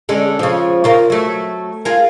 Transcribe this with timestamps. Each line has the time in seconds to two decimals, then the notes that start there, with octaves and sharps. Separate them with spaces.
0.09 D3 G#3 C#4
0.39 C#3 F3
0.84 C#3 F4 A#4
1.10 F#3 A3
1.85 F4 G#4 A#4